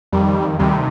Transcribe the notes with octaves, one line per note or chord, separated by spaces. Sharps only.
F2 D#3 G3
D2 C3 D#3 G3